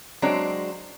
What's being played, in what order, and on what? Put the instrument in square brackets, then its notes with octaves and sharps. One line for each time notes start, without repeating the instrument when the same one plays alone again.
[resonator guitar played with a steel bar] F#3 G#3 C4 D4